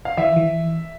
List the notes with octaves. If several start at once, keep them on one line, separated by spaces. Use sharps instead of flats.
F5
E3 E5
E3